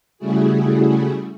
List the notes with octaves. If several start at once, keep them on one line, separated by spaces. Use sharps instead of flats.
C#3 G3 A3 E4 F#4 G#4